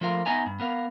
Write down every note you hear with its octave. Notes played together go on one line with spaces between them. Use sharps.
F3 A3 F4 A#4 F5
B3 D#4 D#5 E5 G#5 A#5
G2
B3 A#4 F5